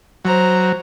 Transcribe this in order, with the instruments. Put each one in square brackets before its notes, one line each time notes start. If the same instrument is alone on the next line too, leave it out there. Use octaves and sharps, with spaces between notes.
[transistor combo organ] F#3 [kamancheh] C5 A#5